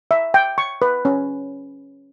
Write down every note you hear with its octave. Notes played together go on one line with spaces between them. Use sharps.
E5
G5
C#6
B4
C#4